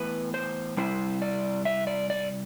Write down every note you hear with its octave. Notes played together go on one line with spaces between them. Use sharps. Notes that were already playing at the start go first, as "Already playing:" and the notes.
Already playing: A2 E3 B3 E4 B4
C5
C3 G3 C4 E4 C5
D5
E5
D5
D5